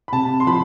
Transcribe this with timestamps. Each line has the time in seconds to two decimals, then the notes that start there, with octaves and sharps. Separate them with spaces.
0.08 B5
0.12 C3 A5
0.40 C6
0.47 F3 B5